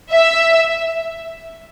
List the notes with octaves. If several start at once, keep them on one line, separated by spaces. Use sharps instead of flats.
E5